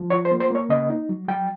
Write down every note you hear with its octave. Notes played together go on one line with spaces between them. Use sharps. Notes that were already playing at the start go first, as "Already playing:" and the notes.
Already playing: F3
F4 C#5
C5
A#3
C5
A#3 C#5
C#3 D#5
D#4
F#3
F#3 G5